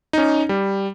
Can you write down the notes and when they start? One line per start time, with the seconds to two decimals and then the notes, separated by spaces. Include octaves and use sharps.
0.13 C#4 D#4
0.49 G3